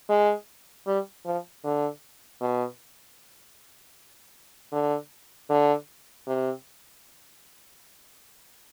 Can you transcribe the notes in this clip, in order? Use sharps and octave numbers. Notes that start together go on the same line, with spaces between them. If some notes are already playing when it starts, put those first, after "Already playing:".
G#3
G3
F3
D3
B2
D3
D3
C3